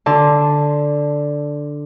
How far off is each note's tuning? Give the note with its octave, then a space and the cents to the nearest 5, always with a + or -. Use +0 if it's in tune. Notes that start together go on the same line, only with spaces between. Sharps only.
D3 +0 A5 +0 C6 +0